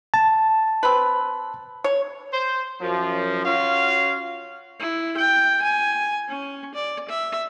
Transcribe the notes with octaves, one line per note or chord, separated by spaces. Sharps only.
A5
C4 B4
C#5
C5
F#2 F3
C#4 F4 F#4 F5
E4
G5
G#5
C#4
D5
E5